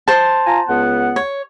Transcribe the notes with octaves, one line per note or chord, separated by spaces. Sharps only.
C5 A5
F4 G#5 A#5
C#2 B3 F#5
C#5